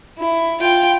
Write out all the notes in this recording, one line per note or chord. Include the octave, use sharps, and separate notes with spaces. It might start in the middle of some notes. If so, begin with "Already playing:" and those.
E4
F4 G5